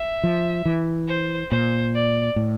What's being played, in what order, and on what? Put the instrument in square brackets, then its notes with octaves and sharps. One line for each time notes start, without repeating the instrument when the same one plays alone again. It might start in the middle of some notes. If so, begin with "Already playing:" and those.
Already playing: [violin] E5
[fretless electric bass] F3
E3
[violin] C5
[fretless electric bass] A#2 [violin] C5
[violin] D5
[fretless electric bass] A2